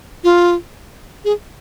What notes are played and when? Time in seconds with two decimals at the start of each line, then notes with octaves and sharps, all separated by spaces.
0.24 F4
1.25 G#4